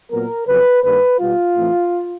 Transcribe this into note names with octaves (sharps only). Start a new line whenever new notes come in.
A#2 F#3 B3 A#4
F2 C#3 F#3 B4
G2 D#3 G3 A#3 B4
B2 G3 B3 F4
A2 E3 A3 C4